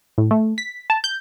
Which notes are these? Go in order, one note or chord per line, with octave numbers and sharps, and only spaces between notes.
A2
A3
B6
A5
G6